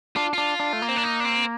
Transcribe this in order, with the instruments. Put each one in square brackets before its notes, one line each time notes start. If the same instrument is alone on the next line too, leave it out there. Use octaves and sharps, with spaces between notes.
[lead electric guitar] D4 [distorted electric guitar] F4
[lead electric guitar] D4 [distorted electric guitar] F4
[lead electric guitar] D4
A3
A#3
[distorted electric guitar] C4
D4
D#4
D4
C4